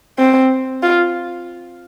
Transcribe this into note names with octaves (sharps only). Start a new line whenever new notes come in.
C4
F4